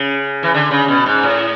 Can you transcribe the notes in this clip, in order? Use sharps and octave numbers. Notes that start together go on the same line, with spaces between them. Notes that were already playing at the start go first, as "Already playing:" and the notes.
Already playing: C#3
E3
D3
C#3
B2
G#2
A2